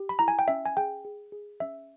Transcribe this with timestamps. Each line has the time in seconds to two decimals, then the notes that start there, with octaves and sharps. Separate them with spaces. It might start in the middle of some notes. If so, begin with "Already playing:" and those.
Already playing: G4
0.09 B5
0.19 E4 A#5
0.28 G#5
0.39 G5
0.48 C#4 E5
0.66 G#5
0.77 G#4 G5
1.05 G#4
1.32 G#4
1.60 C#4 E5